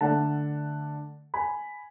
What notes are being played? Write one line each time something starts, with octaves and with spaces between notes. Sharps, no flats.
D3 A3 D4 F#5 A5
G#5 B5